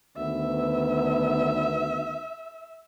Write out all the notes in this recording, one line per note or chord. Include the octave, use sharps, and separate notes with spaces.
D2 D#3 B3 E5